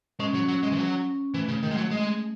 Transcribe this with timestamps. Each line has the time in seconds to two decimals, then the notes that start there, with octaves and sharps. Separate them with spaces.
0.20 G#3 C#4
0.34 F#3
0.48 F#3
0.63 G#3
0.72 E3
0.77 F#3
1.34 E3 A3
1.48 C#3
1.63 D#3
1.70 G#3
1.77 F#3
1.91 G#3